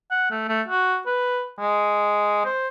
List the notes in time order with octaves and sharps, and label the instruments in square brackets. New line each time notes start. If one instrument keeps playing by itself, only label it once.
[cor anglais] F#5
A3
A3
F#4
B4
G#3
C5